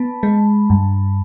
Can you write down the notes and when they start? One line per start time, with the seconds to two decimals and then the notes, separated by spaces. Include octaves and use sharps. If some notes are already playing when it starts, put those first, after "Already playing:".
Already playing: B3 A5 B5
0.23 G#3
0.70 G2